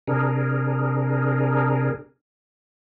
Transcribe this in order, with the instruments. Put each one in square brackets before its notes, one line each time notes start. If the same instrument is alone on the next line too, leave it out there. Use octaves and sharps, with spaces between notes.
[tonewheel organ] C3 D4 G#4 A#4